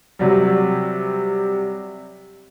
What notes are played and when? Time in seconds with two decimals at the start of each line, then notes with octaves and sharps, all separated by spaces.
0.19 C3 F#3 G3